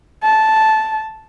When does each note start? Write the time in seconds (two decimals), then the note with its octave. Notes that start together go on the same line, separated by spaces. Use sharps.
0.24 A5